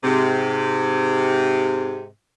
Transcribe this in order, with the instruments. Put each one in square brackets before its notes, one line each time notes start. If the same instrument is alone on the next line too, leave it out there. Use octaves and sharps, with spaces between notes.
[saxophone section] G#2 C3